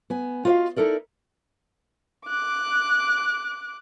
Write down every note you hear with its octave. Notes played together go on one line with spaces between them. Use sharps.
B3 G#5
F4 F#4 B4 D5 D#5 F5
D#4 E4 A4 A#4 D5
D6 F#6